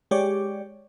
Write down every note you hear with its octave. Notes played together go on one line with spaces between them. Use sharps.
G#3 G4 C#5 D5